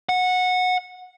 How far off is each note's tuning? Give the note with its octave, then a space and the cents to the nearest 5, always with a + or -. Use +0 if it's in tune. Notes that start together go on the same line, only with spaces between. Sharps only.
F#5 -15